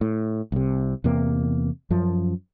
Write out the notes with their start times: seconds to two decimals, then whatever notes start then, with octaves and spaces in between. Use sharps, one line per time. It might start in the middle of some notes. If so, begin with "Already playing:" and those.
0.01 A2
0.52 C2 C3
1.04 E2 C3 A#3
1.90 F#2 F3